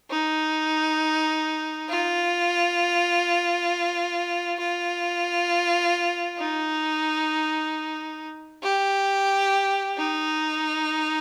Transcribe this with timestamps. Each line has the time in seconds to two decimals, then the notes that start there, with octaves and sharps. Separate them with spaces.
0.10 D#4
1.89 F4
4.59 F4
6.39 D#4
8.63 G4
9.98 D#4